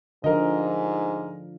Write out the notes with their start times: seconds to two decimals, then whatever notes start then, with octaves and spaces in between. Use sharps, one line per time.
0.24 G#2 D3 F3 A#4 D#5